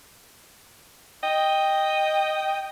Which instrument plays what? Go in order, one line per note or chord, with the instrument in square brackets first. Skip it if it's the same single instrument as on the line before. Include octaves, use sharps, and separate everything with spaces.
[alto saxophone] D#5 [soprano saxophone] G5